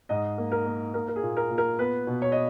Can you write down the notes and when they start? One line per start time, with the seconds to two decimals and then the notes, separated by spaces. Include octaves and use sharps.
0.09 G#2 D#5
0.38 A#3
0.52 A#4
0.66 A#3
0.94 A#3 A#4
1.08 A#4
1.16 G#4
1.23 A#2
1.37 A#4
1.51 A#2
1.58 A#4
1.79 B3 B4
2.07 B2
2.22 C#5
2.32 D#5